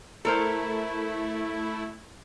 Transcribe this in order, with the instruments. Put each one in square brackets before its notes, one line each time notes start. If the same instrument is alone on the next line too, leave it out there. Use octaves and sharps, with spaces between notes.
[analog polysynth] A3 E4 [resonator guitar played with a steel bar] A4 A#4 C5